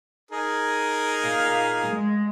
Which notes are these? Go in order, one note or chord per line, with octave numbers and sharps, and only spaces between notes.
D#4 G#4 A#4
A#2 F5
G#3